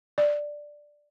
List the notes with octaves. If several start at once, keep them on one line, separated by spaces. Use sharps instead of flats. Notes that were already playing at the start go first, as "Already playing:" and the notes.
D5